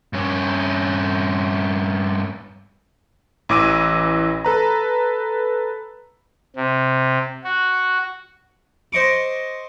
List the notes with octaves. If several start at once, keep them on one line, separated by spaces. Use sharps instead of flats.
G2 C#4
A1 E3 D6 E6 D#7
A4 B4 A#5
C3
F#4
C5 D#5 C#6 D6